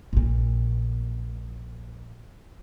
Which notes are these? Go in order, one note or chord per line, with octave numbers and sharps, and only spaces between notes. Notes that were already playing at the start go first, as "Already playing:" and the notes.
A#1 A#2